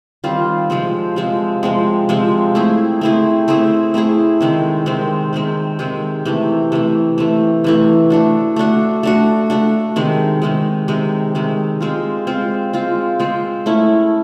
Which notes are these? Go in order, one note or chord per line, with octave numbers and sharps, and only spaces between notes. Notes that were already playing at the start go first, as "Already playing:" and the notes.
D#3 G3 C4 F4
C3 F3 G#3 C4
C3 F3 G#3 C4
C3 F3 G#3 C4
C3 F3 G#3 C4
A3 C4 E4 G#4
A3 C4 E4 G#4
A3 C4 E4 G#4
A3 C4 E4 G#4
C3 D#3 G#3 C4
C3 D#3 G#3 C4
C3 D#3 G#3 C4
C3 D#3 G#3 C4
C3 E3 A3
C3 E3 A3
C3 E3 A3
C3 E3 A3
A3 D4 F#4
A3 D4 F#4
A3 D4 F#4
A3 D4 F#4
C3 D#3 G#3
C3 D#3 G#3
C3 D#3 G#3
C3 D#3 G#3
G#3 C4 F4
G#3 C4 F4
G#3 C4 F4
G#3 C4 F4
A3 C#4 E4